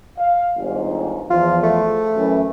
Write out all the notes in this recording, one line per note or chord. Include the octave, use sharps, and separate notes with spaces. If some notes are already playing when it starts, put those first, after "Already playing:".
F5
G1 D#2 G#2
E2 F3 F4
A3
F#2 E3